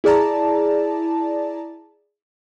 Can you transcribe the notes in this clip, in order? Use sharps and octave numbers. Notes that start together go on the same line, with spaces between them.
E4 G#4 D5 A5 A#5